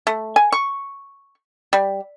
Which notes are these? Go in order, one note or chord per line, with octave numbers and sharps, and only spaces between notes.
A3
G#5
C#6
G3